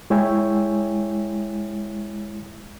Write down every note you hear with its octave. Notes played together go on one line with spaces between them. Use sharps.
G#3 E4 C#5 E5 G5 G#5